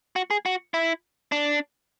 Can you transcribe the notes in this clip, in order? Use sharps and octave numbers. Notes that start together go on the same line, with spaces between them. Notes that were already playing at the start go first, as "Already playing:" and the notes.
F#4
G#4
F#4
E4
D4